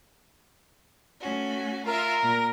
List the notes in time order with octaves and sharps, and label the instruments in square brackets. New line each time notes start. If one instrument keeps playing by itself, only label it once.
[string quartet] A3 C#4 F#4
[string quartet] F4 E5 [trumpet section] A#4
[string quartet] A#2 A#6